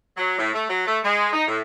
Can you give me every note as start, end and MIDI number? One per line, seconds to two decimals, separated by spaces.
0.17 0.34 54
0.38 0.50 45
0.53 0.64 57
0.69 0.83 54
0.86 0.99 57
1.04 1.27 56
1.33 1.47 63
1.48 1.60 45